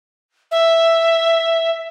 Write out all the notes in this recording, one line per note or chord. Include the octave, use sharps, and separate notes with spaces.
E5